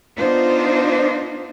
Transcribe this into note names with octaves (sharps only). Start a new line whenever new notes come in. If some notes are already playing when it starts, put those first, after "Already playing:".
B3 D4 D#4 F4 C5